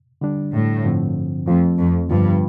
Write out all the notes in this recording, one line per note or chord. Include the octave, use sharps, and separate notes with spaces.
D3 G3 D4
A2
G2 D3 F3 C4
F2 F3 A3 C4
F2
G2 D3 F3 B3 F4 B4